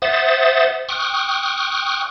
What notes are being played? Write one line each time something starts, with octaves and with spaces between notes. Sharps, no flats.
C5 E5 F#5 D#6 A6
G5 C#6 D#6 F6 F#6